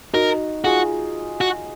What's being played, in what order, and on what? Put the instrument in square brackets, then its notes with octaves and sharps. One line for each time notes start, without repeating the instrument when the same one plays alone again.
[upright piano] D#4 F#4 [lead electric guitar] A#4
[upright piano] F4 G#4 [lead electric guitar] F#4
[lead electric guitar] F#4